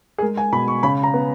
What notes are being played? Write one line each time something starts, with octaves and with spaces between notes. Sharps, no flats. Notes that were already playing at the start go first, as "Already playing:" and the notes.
G#4
G#3 A#4
G#5
B2 B5
C#6
C#3 B5
A#5
B3